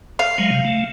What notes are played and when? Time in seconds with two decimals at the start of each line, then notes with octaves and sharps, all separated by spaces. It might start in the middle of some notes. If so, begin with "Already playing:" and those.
0.19 F5
0.38 F#3 G#3
0.51 C3
0.65 A3